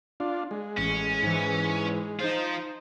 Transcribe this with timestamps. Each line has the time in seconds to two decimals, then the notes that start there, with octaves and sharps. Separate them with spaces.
0.20 D4 F4
0.51 G#3
0.77 A1 C#4
1.22 G#2 E3
2.20 F3 D#4 F4 C5